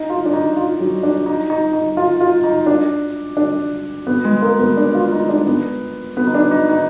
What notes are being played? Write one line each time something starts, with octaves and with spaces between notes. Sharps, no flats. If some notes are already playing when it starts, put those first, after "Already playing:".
Already playing: D#4
F4
D4
D#4
F4
F#3
D4
D#4
D#4
D#4
F4
F4
D#4
D4
D4
B3
G#3
A#3
B3
D4
F4
D#4
D4
B3
B3
D#4
D4
D#4
D#4